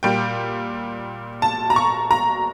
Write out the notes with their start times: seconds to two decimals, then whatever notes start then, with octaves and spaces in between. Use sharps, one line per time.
0.03 A#2 G3 G5
1.42 A5
1.70 A#5
1.76 C#6
2.11 A#5